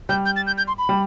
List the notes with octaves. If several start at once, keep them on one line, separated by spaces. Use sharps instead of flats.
G3 G6
G6
A6
G6
G6
C6
B5
G3